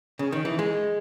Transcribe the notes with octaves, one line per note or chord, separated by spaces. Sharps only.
C#3
D#3
E3
G#3